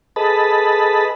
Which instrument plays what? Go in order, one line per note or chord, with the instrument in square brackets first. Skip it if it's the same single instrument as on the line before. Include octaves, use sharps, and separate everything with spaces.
[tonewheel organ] G#4 A4 B4 D#5 A5 B5